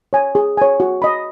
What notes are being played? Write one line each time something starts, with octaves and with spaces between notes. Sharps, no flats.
C#5 G#5
G#4
C#5 G#5
F#4
D#5 B5